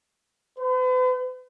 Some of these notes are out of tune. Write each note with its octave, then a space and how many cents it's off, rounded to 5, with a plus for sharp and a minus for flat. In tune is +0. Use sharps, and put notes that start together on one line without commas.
B4 +45